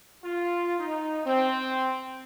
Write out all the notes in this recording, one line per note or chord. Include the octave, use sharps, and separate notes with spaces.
F4
D#4
C4